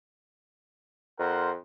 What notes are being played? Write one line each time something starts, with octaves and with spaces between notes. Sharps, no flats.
F2 A#4 C5 F#5